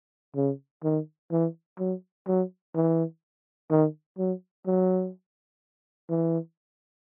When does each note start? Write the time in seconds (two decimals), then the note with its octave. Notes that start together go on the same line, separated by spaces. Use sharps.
0.36 C#3
0.84 D#3
1.31 E3
1.79 F#3
2.27 F#3
2.75 E3
3.71 D#3
4.18 F#3
4.67 F#3
6.09 E3